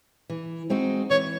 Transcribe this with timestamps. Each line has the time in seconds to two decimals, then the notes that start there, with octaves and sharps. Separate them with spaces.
0.30 E3
0.70 G#3 C4 D#4 F#4
1.10 E3 C#5